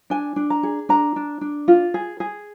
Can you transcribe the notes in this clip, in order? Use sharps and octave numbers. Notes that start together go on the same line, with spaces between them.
D4 G#5
D4
A#5
G#4
D4 A#5
D4
D4
F4
G#4
G#4